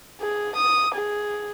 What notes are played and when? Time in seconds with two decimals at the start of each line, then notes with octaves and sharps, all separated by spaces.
0.21 G#4
0.56 D#6
0.95 G#4